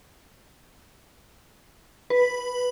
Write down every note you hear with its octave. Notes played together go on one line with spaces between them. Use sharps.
B4